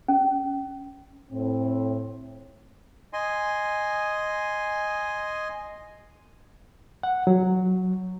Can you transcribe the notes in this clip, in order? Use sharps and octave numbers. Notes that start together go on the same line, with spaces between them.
C#4
A2 C4
D#5 G#5 C6
F#5
F#3